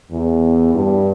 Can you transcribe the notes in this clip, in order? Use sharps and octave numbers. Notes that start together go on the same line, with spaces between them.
E2
G2